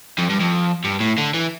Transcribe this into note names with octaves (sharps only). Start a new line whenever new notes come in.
F2
G2
F2
G2
A2
D3
E3